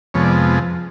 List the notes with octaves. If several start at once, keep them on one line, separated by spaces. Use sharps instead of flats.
F2 C3 F3 G#3 B3 C#5
D5